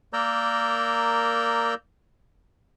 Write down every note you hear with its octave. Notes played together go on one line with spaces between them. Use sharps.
A#3 A#4 D5 A#5 E6 G6